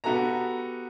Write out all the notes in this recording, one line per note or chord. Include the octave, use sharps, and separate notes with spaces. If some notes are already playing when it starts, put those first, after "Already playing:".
B3 F#4 G4 A4 A#5